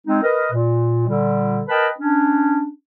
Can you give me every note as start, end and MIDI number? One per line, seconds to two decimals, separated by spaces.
0.07 0.21 56
0.07 0.21 60
0.07 0.21 63
0.23 0.49 70
0.23 0.49 71
0.23 0.49 75
0.52 1.07 46
1.07 1.62 46
1.07 1.62 50
1.07 1.62 55
1.69 1.88 70
1.69 1.88 71
1.69 1.88 75
1.69 1.88 79
1.69 1.88 81
1.69 1.88 83
1.99 2.67 61
1.99 2.67 62